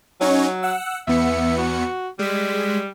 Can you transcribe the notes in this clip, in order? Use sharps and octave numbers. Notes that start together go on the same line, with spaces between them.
F#3 C#4 D#4 C#5
F#5 E6
E2 B3 E5 C#7
F#4
G3 G#3 B6